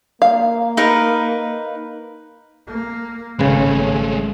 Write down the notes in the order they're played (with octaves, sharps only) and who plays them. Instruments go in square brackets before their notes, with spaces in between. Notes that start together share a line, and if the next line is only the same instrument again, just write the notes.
[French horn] A#3 [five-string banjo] F5
[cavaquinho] D#4 A#4 B4
[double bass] A#3
[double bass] G#1 C#4 [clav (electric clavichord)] C#3 B4 [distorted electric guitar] G#3 A3